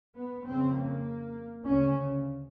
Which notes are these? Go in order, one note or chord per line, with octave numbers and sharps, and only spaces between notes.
B3
F2 C#3 C4
A#3
D2 C#3 C#4